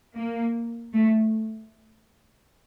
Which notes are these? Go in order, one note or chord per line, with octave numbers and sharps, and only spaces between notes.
A#3
A3